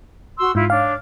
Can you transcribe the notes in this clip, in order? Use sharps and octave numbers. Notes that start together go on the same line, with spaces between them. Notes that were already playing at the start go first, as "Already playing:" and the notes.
F#4 C6 E6
G#2 E4 F4
D4 C#5 F5